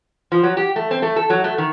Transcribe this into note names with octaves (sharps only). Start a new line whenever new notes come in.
F3
F#3
G4
A3
C4
A3
A4
F#3
A3
D#3